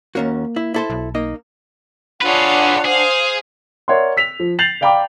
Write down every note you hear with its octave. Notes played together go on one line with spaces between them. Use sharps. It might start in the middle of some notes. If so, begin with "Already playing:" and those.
D#2 A#3 C#4 F#4
E4
E4 A4 C5
B1
A#3 D#4 D#5
D4 F4 G#4 B4 C#5 F#5
G#4 C5 F5
A#4 C#5 D5 E5 F#5 C6
E6 B6 F7
F3
G6 A6 C7 F7 F#7
D5 F5 G5 A#5 B5 D6